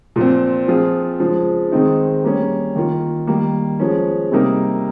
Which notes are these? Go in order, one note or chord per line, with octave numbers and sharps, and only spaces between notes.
A#2 F3 C4
F3 C4 F4 G#4
C#3 F3 G#3
D#3 G#3 C4 D#4
G3 A#3 C#4
D#3 A#3 F4
D#3 G3 A#3
F3 G#3 C#4
C3 G3 A#3 D#4 A#4